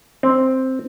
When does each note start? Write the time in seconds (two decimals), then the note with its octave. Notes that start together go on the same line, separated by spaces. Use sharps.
0.23 C4